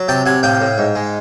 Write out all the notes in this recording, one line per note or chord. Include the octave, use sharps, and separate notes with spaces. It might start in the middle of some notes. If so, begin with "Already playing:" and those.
Already playing: F#3
C3 G5 A5
C3 F#5 G#5
A2 F5 G5
A2
G#2
G#3